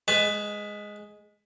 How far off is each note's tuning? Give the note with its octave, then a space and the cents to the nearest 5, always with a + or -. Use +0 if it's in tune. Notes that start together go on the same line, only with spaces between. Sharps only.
G#3 +0 B4 +15 A5 -40